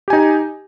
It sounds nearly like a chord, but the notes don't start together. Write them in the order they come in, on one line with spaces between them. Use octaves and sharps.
G4 G#5 D#4